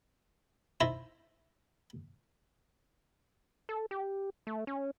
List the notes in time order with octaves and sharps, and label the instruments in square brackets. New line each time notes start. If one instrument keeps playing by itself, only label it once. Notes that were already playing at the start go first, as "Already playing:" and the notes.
[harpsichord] D#4 E4 C5 E5 A5 A#5
[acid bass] A4
G4
A3
C#4